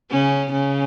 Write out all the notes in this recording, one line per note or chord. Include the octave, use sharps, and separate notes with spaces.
C#3 C#4
C#3 C#4